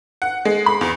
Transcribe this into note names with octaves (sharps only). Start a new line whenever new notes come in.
F#5
G#3
B5
E2